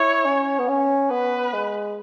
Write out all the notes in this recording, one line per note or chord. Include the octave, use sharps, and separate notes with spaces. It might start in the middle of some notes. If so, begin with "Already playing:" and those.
Already playing: E4 C#5
C#4
B3
C#4
B3 B4
G#3